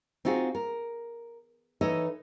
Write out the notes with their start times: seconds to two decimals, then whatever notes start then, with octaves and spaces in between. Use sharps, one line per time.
0.25 C4 D#4 F4 F#4 G#4
0.55 A#4
1.81 E3 D#4 A4 C#5 D#5